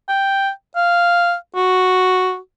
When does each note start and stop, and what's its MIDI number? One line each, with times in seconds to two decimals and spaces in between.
0.09 0.50 79
0.76 1.34 77
1.56 2.37 66